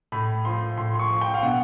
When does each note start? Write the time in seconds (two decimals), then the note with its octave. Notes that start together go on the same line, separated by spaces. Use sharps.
0.12 A2 B5
0.45 F3 C6
0.77 A2 C6
0.94 C6
0.99 C#6
1.10 F3
1.21 G5
1.34 F5
1.43 B2 F#5